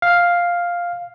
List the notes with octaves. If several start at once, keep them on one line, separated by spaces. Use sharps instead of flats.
F5